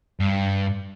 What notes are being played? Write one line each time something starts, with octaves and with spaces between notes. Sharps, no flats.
G2